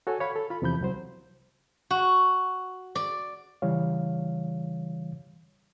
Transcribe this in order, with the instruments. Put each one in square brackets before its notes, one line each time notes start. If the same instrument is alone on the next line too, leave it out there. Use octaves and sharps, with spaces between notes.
[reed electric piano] F#4 A4 C#5 G#5
C#5 F5 B5
A4
F4 B5
E2 C3 F3 B5 G6
C2 F#3 C5
[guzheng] F#4
D5
[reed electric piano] C#3 E3 G3 C#5 F5